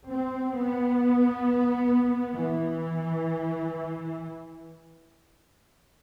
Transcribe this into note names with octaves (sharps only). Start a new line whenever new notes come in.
C4
B3
E3